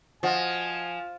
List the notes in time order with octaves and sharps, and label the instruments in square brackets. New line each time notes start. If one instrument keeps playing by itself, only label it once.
[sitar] F3 [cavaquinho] F#4 D#5 [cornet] G#5